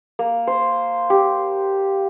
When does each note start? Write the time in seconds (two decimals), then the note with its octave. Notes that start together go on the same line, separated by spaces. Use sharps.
0.19 A#3
0.47 C5
1.10 G4